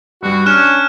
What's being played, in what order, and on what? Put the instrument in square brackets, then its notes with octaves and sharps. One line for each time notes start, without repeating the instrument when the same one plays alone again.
[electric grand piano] G2 G3 [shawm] F#4
[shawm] C#4 [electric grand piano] D4 [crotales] F6 F#6 E7